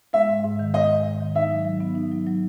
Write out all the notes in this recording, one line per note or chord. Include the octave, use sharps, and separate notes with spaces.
G#3 E5
G#2
G#2
D#3
G#3 D#5
G#2
G#2
D#3
D#4 E5
F#3
F#3
B3
D#4
F#3
F#3